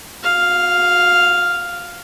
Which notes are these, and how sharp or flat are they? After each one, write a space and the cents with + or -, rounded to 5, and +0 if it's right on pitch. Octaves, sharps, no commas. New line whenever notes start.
F#4 -40 F5 +0